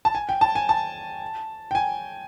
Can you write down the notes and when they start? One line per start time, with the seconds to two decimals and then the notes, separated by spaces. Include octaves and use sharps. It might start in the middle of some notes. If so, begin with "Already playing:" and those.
0.05 A5
0.15 G#5
0.29 G5
0.41 A5
0.55 G#5
0.69 A5
1.71 G5
1.75 G#5